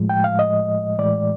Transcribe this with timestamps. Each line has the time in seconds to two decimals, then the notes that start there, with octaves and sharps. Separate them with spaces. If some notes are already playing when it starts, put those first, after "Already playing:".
Already playing: A2 F3 G#3
0.09 G5
0.24 F5
0.39 D#5
0.98 A2 E3 G#3 D5